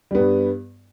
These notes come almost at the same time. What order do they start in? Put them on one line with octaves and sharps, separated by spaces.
G3 B3 G2